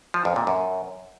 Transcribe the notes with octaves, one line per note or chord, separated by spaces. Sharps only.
F3
F2
A#2
F#2